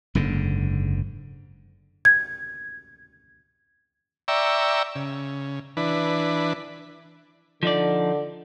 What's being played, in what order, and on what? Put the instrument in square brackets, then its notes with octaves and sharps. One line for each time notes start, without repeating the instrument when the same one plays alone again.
[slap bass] F#1 G#2 D3
[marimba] G#6
[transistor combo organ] D5 E5 G5 A#5 C#6 E6
C#3
E3 D4 B4
[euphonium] D3 [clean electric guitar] F3 D#4 D5